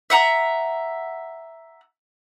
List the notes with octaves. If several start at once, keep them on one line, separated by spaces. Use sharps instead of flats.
E5 F#5 A#5